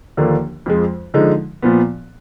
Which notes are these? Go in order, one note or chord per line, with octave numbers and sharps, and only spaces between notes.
D#2 D3 F3 A#3 D4
F2 F3 G#3
D3 F3 G#3 D#4
A#2 F3 B3